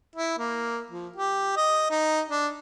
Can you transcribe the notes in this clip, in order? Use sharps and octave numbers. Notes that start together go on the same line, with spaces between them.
E4
A#3
F3
G4
D#5
D#4
D4